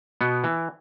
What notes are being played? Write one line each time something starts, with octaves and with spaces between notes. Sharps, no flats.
B2 B3
E3